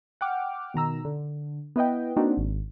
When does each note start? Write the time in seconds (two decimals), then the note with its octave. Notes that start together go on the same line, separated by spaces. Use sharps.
0.21 F#5 G5 D6 F6
0.74 B2 D#3 A#5 E6
1.05 D3
1.76 B3 E4 B4 D#5 G5
2.16 A#3 C4 D4 D#4 F#4
2.37 G#1